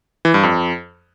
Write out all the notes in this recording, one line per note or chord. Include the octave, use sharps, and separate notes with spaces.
E3
G2
F2